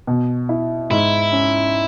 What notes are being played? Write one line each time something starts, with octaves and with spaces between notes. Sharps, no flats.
B2
E4
G#2 E4
C#4